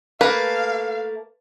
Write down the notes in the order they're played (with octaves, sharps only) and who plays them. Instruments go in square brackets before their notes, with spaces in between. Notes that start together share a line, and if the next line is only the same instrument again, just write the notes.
[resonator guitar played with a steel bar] A3 A#3 [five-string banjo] B4 [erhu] F5